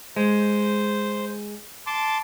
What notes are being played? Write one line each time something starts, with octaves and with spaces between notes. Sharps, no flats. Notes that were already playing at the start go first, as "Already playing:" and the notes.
G#3 C5
A5 C6 D6